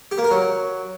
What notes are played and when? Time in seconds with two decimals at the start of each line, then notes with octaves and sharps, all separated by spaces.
0.11 G4
0.18 A#3
0.24 A#4
0.31 F#3